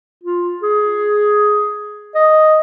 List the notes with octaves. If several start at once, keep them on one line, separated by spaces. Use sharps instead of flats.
F4
G#4
D#5